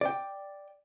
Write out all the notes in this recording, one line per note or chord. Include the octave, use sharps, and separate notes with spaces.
D5 G5